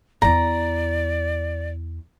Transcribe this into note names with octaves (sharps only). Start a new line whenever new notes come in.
E2 E4 D5 A#5